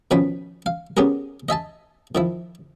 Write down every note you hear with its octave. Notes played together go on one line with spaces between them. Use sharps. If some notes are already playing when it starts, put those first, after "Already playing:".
B2 D#3 F3 C#4 G5 B5
F5
B3 C#4 G4 G#4 A#4
D#5 E5 G#5 A5
D#3 F3 E4